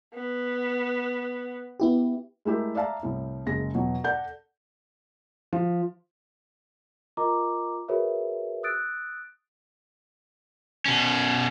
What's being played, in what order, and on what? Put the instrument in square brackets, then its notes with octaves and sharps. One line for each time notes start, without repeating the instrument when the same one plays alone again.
[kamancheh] B3
[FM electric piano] B3 E4 G4
[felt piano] G#3 A3 E4 G4 A#4
D5 E5 F5 A5 A#5
C2 A2
F#1 G#3 A#6
E2 B2 F#3
A4 D5 F#5 A5 G6
F3
[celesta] F4 A#4 D#5 A#5 D6
F#4 G#4 A#4 B4 C#5 E5
D#6 E6 F#6 A6 D7
[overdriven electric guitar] B2 C#4